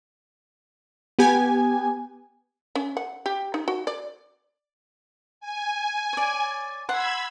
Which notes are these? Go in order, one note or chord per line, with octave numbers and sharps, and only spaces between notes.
B3 G4 G#5
C#4
F#5
G4
D#4
F#4
D5
G#5
C#5 D5
F#5 B5 C6 E6 G#6